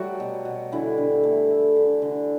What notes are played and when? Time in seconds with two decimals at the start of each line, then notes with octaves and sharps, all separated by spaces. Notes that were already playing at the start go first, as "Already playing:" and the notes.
Already playing: F#3 G3 A3 F#4 A4
0.20 B2
0.45 B2
0.72 D3 E3 E4
0.98 D3
1.23 A3
1.50 A3
1.76 D3
2.02 D3